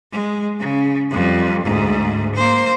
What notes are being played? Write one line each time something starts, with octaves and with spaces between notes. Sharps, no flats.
G#3
C#3
F2 G3
D2 G#2
A#3 C5